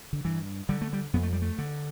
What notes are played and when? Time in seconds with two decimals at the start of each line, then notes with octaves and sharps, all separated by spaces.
0.13 D3
0.25 G2 E3
0.69 D3 G3
0.81 A3
0.93 G3
1.13 F2 B3
1.23 A3
1.33 G3
1.42 A3
1.58 D3